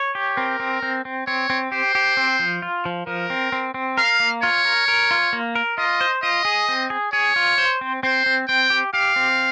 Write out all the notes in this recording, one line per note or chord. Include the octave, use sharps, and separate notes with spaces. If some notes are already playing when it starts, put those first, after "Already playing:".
Already playing: C#5
G4
C4 A#4
C4
C4
C4
C4 C#5
C4
G4 C5
G4
C4
F3
F4
F3
F3 A#4
C4
C4
C4
A#4 F5
A#3
F4 C#5
A#4
A#4
F4
A#3
A#4
F4 D#5
C5
F4 D#5
G#4
C4
G#4
G#4 C#5
F4
C5
C4
C4 C5
C4
C4 G5
G4
G4 F5
C4